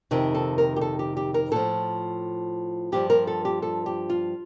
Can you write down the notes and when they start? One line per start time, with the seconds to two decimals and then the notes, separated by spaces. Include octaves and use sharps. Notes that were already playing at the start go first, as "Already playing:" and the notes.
0.11 F2 C3 D#3 D#4
0.35 A4
0.58 A#4
0.76 G4
0.81 A4
0.99 G4
1.17 G4
1.34 A#4
1.51 A2 F3 A4
2.92 G2 F3 G4
3.10 A#4
3.27 A4
3.45 G4
3.62 A4
3.86 G4
4.10 F4